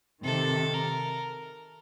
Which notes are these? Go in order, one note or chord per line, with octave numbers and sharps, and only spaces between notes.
C3 D#3 A4
A#4